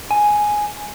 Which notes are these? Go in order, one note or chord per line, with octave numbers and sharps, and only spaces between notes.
G#5